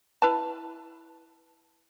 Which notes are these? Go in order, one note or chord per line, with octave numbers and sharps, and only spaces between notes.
E4 B4 A5